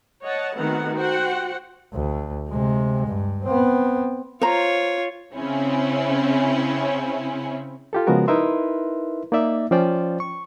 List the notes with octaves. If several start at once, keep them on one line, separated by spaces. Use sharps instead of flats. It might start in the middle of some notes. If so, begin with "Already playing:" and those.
C#5 D#5 F#5 A5
D#3 A3 B3 C4 F#4 F#5
F#4 C5 F#5 G5
D2
C3 G#3
G2
B3 C4
F4 C5 C#5 A#5
C#3 C4 C#4 E4
F4 G4 A4
C#3 F3 G#3 B3 F#4 A#4
D#4 E4 A#4 B4 E5 C6
A#3 D#4 D5 E5
F3 C#4 F4 C5 D5 G5
C#6